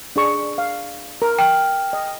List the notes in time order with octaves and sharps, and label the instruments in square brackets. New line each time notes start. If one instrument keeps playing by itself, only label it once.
[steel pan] D4 G#4 C#6
F5
A#4
[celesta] G5 F6
[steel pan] D#5